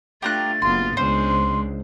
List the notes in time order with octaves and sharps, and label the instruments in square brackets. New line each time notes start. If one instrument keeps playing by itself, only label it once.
[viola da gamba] A3 D4 F4 [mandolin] G4 A#5 F#6 [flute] A6
[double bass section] F#1 B3 [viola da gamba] F4 [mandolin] C6
[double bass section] C#2 [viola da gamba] G#3 C#4 D4 [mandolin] C5
[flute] C6